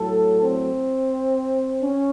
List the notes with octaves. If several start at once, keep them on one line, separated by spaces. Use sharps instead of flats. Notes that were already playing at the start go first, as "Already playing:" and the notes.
Already playing: A2 F#3 A4
C4
C#4